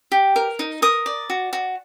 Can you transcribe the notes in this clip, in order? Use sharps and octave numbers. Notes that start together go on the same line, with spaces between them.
G4
A#4
D#4
A#4 D#6
D5
F#4
F#4